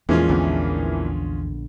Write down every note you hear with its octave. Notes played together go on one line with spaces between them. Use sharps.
E2 A#2 E3 F3 G#3 C#4 F4
A#1 D3 B3